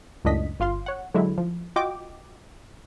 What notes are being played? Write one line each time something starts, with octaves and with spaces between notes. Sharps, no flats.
C#2 F#2 A2 D4 D#5 B6
G1 F4 F5 C6
C#5 F#5
D3 F#3 G#3 E4
F3
F4 F#4 D#5 G5 D6